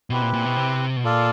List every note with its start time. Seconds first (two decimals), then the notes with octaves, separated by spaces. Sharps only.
0.10 B2 C4 E4 G4 B4
0.22 A#2
0.33 A#2
0.45 B2
0.57 C3
0.96 B2
1.04 A#2 F4 A4 D5 F5